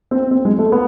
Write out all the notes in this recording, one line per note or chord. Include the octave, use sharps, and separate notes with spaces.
C4
C4
G#3
A3
B3